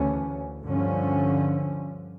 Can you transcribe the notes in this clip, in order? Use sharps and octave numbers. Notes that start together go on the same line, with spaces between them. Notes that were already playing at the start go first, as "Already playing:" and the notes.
Already playing: D2 C#3 E3 A3 C#4
G2 D3 F3 C#4